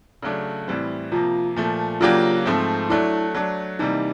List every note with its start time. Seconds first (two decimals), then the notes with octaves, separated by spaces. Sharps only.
0.22 C#3 F#3 A3 D4
0.68 A2 E3 G3 C4
1.12 C3 F3 A#3 F4
1.56 A#2 F3 A3
2.01 C#3 F#3 A#3 D4 F4 G4
2.46 G#2 F3 A3 C4
2.90 F#3 A3 D4 E4
3.35 F#3 A3 D4
3.79 C3 E3 G3 A#3 D#4